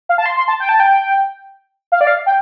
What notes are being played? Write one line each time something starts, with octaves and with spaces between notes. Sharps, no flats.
F5
A5
C6
C6
A5
G5
A5
G5
F5
D5
F5
G5